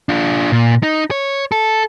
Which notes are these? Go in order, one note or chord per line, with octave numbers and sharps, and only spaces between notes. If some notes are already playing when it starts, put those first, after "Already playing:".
D4 F4
A#2
D#4
C#5
A4